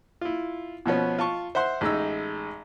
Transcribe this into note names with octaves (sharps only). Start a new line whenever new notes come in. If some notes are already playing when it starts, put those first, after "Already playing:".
E4 F4
B2 F3 B3 C#4
F4 A5 C#6
C5 E5 F#5 C6
A1 G#3 D#4 E6